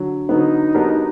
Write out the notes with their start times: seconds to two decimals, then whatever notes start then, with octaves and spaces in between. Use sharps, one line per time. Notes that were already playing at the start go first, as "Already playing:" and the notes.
Already playing: D3 F#3
0.29 D3 F#3 B3 D#4
0.75 F#3 B3 D4 G4 A#4